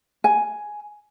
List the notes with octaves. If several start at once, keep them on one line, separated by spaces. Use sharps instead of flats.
G#5